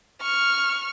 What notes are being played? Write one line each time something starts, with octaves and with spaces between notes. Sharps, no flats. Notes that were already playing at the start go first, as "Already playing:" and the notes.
C#6 F6